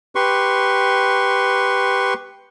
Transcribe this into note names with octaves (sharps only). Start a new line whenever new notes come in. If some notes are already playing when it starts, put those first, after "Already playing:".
G4 B4 C6 C#6